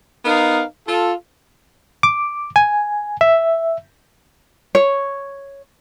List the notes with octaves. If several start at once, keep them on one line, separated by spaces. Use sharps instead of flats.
B3 D#4 A#4 F5
F4 A4
D6
G#5
E5
C#5